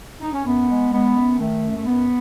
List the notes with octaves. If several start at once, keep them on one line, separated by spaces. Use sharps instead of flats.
D#4
C#4
F#2 B3
G#3
G#3 B3
F#2
D#3 A3
F#2
A3
F#2 B3